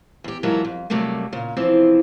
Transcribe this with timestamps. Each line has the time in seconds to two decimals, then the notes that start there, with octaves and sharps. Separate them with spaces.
0.24 E2 G4
0.43 G#2 E3 F#3 F4 A#4 A5
0.65 F2
0.90 C3 F#3 G3 A3 A#3
1.32 A#2 C#3
1.57 C3 E3 F3 C4